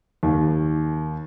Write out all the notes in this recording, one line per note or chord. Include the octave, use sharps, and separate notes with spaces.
D#2 D#3